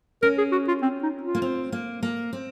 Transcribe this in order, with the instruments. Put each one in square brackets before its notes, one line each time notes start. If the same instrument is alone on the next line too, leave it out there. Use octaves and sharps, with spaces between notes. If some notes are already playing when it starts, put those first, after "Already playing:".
[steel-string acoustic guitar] C#4 [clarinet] A#4
[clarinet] G#4
F#4
F4
C4
D#4
F4
[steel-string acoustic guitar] A#3
C4
A#3
A#3
C4